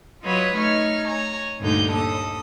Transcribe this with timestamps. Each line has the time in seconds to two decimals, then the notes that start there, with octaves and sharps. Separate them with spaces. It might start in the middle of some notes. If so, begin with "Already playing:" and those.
0.24 F#3 F4 B4 C#5 D#5 B5
0.56 A3 D#4 C#5 C#6 F6
1.07 C#5 G#5 A#5
1.61 D2 G2 A#2 D3 D#4 G6
1.91 D#2 A4 D#6